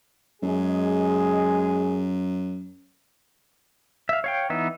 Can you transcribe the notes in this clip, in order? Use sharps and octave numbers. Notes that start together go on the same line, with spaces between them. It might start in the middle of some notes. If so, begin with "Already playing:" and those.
F#2 G#3 G#4
E5 F5
C#5 F5 G5
E3 B3 D#4 E5